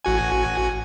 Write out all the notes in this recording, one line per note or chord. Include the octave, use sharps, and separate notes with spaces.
A1 F#4 G#5